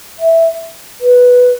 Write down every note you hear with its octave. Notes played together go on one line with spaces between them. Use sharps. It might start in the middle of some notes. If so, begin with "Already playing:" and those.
E5
B4